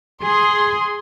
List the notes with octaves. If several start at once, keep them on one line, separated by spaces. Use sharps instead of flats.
G#4 C6